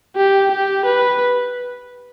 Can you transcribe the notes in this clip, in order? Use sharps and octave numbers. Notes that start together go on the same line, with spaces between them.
G4
G4
B4